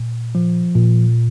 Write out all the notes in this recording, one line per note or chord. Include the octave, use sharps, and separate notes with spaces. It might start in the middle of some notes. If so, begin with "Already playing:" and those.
Already playing: A#2
F3
A#2